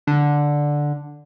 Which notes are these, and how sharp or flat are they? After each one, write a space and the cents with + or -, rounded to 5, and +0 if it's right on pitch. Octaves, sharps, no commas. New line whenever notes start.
D3 +0